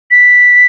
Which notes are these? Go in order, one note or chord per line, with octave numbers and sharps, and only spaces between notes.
B6